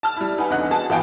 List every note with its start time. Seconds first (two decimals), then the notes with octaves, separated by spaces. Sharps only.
0.03 A5 F6
0.16 G3 E4
0.38 D#4 B4 F#5 G#5
0.50 E2 D3 C4 D#5 F#5 F#6
0.71 F#4 G#4 A5
0.89 G#1 E3 B3 F5 G5 G#5